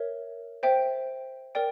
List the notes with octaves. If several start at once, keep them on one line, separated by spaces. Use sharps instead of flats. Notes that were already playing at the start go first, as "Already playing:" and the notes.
Already playing: A#4 C#5 E5
C5 E5 G5
A#4 D5 G5